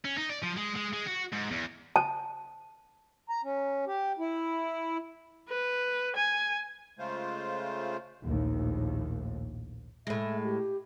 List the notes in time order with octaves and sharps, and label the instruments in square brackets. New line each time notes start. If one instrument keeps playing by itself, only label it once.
[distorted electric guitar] C#4
D#4
D5
F3
G#3
G#3
G#3
F#4
G#2
E2
[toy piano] A5
[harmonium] A#5
C#4
G4
E4
[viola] B4
G#5
[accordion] C#3 G#3 A3 F4 C5
[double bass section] A#1 D#2 A2
[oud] A2 G#3 [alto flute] E5
[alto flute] G4